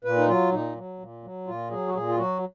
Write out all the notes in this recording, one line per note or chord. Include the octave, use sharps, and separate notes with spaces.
A#2 B4
D#4
F#3 F4
A#2 D#4
F#3
A#2
F#3
A#2 F4
F#3 G#4
F#4
A#2 G#4
F4
F#3 F#4